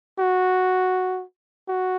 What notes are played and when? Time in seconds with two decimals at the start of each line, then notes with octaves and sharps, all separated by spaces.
0.19 F#4
1.68 F#4